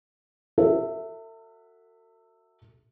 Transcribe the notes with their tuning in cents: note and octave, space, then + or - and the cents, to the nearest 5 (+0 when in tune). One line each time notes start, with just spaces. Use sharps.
F#4 -10 A4 +45 E5 -5